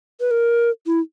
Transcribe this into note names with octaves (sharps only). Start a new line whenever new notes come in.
B4
A#4
E4